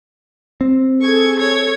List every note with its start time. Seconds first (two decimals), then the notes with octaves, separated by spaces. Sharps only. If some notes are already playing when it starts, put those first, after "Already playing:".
0.61 C4
1.02 G#4 A4 C#6 G#6
1.39 C#5 G#6